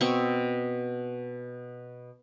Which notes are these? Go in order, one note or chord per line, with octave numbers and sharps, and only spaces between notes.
B2 C4 C#6